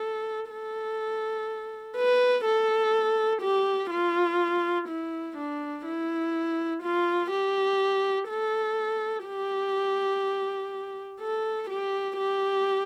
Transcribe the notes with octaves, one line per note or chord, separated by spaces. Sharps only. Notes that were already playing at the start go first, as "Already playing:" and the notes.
Already playing: A4
A4
B4
A4
G4
F4
E4
D4
E4
F4
G4
A4
G4
A4
G4
G4